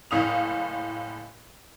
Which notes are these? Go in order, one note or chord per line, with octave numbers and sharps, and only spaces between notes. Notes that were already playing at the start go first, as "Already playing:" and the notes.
F#1 A2 F5 D#6 F7